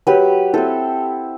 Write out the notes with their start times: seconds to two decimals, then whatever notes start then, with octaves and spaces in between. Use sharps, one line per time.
0.07 F#3 G4 B4
0.53 C4 E4 A4 C5